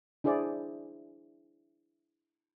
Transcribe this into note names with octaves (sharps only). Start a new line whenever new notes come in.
D4 E4 G#4 C5 D5